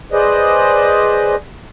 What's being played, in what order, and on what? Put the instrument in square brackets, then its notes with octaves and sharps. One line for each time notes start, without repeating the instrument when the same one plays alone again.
[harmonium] G#4 B4 C5 D5 D#5